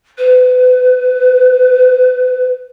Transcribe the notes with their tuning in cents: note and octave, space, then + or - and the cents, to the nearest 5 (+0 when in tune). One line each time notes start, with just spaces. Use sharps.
B4 +30